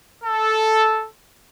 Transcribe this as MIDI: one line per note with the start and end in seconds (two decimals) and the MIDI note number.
0.24 1.06 69